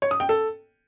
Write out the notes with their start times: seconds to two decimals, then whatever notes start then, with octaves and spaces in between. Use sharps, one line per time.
0.02 C#5
0.11 D#6
0.20 G5
0.29 A4